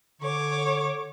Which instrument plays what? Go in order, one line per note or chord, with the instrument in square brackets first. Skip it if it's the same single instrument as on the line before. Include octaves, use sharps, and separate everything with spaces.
[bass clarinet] D3 [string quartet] C#5 D6